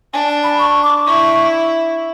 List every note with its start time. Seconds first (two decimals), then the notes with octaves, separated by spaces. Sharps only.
0.13 D4 G#5
0.29 A5
0.43 B5
0.59 C#6
0.83 D6
1.05 E4 C#6